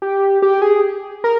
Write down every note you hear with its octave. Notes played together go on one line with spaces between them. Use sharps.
G4
G4
G#4
A#4